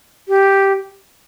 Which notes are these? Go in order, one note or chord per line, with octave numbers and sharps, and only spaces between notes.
G4